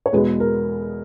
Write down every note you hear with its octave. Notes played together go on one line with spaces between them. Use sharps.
C#5
E2 B2 G#3 B3 B4
A#4